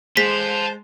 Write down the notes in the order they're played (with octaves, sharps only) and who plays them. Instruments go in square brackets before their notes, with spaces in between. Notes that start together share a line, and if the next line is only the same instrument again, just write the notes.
[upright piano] G#3 [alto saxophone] C5 [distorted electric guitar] A5 C6 [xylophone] B6